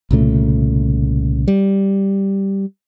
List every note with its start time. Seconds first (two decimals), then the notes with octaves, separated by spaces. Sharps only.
0.11 C2 A#2 C#3 A3
1.48 G3